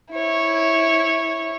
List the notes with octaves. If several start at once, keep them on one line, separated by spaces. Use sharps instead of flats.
E4 C#5